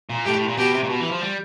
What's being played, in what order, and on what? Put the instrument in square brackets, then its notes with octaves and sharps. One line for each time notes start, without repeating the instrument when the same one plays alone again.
[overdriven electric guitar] A#2
[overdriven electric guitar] A2 [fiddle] G4
[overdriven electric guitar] A2
A#2
[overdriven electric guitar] B2 [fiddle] G4
[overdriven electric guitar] C3
A#2
B2
E3
F3
G3